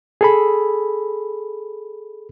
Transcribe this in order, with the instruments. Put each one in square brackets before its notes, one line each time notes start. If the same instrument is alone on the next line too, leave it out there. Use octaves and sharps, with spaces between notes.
[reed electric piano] G#4 A4 B5